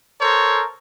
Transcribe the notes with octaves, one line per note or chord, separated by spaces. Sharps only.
A4 A#4 C5 C#5